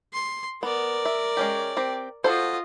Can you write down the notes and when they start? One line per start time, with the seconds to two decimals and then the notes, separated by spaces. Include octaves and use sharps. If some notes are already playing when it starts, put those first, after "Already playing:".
0.13 C6
0.63 B3 A#4 D5
1.05 E5
1.37 G#3 C#4 G4
1.77 C4 G4
2.24 F4 F#4 A4 C5 D#5